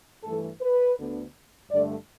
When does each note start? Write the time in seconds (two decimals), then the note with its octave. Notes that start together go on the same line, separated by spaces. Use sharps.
0.23 G2 E3 A3 A4
0.60 B4
0.96 D2 D3 B3
1.69 G2 D3 A3 D5